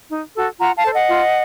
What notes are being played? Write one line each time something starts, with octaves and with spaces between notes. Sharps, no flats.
D#4
F#4 A4
F4 F#5 A#5
F5 A5
A4 C5
D#5 F#5
F4